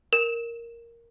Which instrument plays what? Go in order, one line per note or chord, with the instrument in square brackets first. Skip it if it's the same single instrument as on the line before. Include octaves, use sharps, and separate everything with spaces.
[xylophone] A#4 [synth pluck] E7